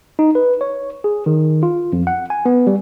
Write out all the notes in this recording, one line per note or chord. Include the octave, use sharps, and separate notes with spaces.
D#4
B4
C#5
G#4
D#3
F4
F2
F#5
G#5
B3
G3